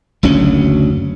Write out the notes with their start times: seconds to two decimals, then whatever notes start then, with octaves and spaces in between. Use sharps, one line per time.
0.23 F#1 D2 F#3 C#4